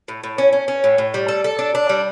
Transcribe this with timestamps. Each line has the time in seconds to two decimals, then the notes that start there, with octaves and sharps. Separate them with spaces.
0.08 A2
0.23 A2
0.38 C#4
0.53 C#4
0.68 C#4
0.84 A2
0.98 A2
1.14 G3
1.28 A4
1.44 A4
1.59 D4
1.75 D4
1.89 G3